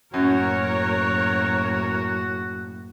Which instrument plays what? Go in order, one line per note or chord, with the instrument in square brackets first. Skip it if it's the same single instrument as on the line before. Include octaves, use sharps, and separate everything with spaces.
[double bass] F#1 A2 [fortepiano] F#2 [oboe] F#4 [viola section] A#4 C#5